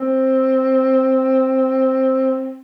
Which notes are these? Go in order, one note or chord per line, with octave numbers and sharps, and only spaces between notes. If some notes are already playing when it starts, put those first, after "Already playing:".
Already playing: C4